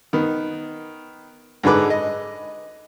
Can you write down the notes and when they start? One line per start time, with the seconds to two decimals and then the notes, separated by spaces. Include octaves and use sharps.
0.13 D#3 B3
1.63 G#2 D3 G#3 B4 D6
1.90 D#5